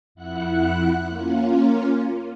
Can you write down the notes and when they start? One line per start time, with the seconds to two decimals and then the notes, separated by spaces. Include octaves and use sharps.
0.15 F2 E4 F#5 F#6
1.08 A#3 C#4 F4